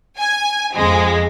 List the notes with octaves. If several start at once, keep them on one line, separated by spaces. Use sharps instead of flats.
G#5
F2 G#3